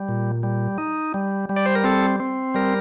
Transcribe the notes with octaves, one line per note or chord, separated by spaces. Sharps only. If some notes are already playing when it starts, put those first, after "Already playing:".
Already playing: G3
A#2
G3
D#4
G3
G3
D5
C5
A#4
C4 A4
C4
G3 A#4